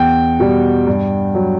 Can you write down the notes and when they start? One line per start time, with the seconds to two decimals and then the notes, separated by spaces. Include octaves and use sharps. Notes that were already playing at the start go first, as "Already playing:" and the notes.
Already playing: E2 G5
0.40 B2 G3
0.87 G2
1.35 F#3